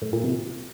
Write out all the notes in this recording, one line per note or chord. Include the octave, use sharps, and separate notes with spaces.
A2
A#2
C3